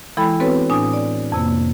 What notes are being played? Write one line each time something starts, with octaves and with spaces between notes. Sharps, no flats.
E3 G#3 E4 A4 G5 B5
B3 C4 F#4 A4 B4 C#5
A2 D4 G#5 D#6
D5
F2 C3 A#3